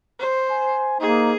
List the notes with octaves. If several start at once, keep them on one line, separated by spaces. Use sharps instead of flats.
C5
G#5
A#3 D#4 G#4